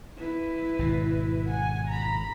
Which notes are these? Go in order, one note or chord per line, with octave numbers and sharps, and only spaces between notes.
E4 B4
G#1 B2
F#5 G#5
A#5 B5